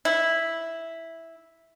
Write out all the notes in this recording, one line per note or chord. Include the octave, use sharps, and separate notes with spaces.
E4